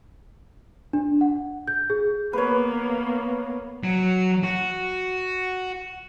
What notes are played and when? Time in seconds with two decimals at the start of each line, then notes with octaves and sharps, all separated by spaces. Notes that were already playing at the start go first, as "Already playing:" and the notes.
0.93 D4
1.21 F#5
1.68 G6
1.90 G#4
2.33 A#3 B3 B4 C#5
3.84 F#3
4.44 F#4